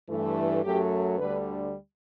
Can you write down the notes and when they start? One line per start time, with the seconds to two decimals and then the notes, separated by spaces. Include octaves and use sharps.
0.09 G2 E3 A3
0.64 F#2 F#3 A3 G4
1.18 D2 D3 G3 B4